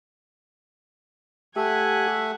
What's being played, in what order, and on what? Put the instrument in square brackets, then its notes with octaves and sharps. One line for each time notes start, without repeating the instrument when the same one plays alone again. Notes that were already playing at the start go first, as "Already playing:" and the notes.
[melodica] A3 E5 [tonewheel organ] G4 [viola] F#5 G#5